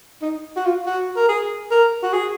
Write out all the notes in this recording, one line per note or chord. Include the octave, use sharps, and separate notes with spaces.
D#4
F#4
F4
F#4
A#4
G#4
A#4
F#4
G#4